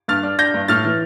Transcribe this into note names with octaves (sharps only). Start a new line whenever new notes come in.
G2 F6 A6
D4
D4 G6 A#6
G2
A2 F6 A6
E3